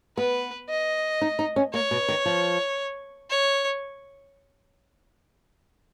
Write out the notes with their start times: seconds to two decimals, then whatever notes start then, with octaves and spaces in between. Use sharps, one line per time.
0.17 B3 B4
0.69 D#5
1.21 D#4
1.39 D#4
1.56 C#4
1.74 A#3 C#5
1.91 B2
2.08 D#3
2.26 F3
3.30 C#5